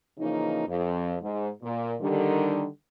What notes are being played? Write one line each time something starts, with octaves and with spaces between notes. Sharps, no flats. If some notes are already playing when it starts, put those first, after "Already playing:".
C#3 E3 F3 A#3 D#4
F2
G#2
A#2
D3 D#3 G3